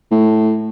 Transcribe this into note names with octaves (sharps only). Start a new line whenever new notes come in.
A2